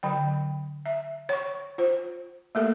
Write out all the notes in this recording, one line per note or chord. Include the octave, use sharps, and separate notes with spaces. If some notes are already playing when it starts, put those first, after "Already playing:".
D3 F#3 G5
E5
C#5 C#6
F4 C5
A3 A#3 A4 A#4